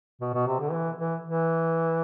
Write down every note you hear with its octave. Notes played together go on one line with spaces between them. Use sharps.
B2
B2
C3
D3
E3
E3
E3